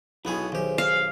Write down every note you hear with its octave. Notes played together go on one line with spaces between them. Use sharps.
B1 B3 E4 F#4 G#4 G#5
B1 D#3 G4 G#4 C5 G#5
F5